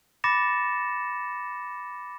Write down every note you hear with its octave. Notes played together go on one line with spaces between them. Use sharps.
B5 D6 A6 A#6 C#7 E7